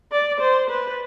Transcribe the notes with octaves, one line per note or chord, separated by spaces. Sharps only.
D5
C5
B4